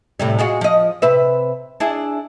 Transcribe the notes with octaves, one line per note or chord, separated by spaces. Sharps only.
A2 C3 G3
G#3 F4 F#4
F3 D#5
C3 B4 E5
D4 E4 G#4